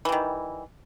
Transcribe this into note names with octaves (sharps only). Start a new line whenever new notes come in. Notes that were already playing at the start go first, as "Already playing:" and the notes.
D#3 E3 G3